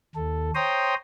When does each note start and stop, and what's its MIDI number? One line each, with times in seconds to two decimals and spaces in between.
0.15 0.51 39
0.15 0.51 69
0.55 0.95 72
0.55 0.95 73
0.55 0.95 79
0.55 0.95 82
0.55 0.95 84
0.55 0.95 87